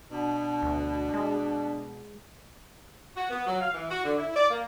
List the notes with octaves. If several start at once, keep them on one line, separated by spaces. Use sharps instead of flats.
B2 D4
D2
G#3
F#4
B3
F#3
F5
E3
F#4
D3
E4
D5
A#3